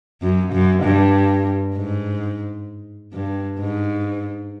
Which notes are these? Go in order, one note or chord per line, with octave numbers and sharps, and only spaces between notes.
F#2
F#2
G2
G#2
G2
G#2